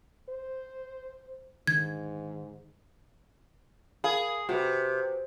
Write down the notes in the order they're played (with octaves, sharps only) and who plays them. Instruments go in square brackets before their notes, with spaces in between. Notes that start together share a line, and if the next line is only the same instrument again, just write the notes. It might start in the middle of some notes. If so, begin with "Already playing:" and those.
[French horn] C5
[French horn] G#2 [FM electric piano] D3 D#3 [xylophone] G#6
[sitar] G#4 [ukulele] A#4 F5 B5
[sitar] C3 [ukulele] F#4 B4